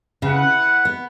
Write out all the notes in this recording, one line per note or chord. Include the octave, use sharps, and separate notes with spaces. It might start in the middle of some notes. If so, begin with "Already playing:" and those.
C#3 E4 B4 F#5
B3